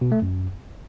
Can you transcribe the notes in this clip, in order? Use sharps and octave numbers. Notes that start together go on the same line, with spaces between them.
B2
A3
F#2